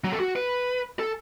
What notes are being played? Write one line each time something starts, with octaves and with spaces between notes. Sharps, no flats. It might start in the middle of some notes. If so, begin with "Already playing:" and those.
F#3
A4
F#4
B4
A4